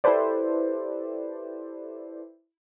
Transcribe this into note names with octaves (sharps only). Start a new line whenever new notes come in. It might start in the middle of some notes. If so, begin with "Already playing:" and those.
E4 G4 A4 B4 C5 D5